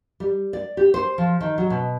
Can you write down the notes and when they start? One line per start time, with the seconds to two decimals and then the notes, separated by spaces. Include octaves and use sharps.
0.20 G3
0.53 D5
0.77 G4
0.94 C5
1.18 F3
1.41 D#3
1.58 F#3
1.70 B2